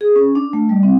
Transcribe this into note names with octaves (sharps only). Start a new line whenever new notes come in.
G#4
C#4
D4
A3
G3
C4